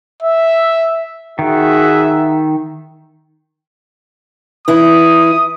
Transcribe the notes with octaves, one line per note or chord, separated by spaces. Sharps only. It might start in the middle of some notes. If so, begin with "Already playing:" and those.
E5
D#3 F#4 G#4 E5
E3 E4 D#6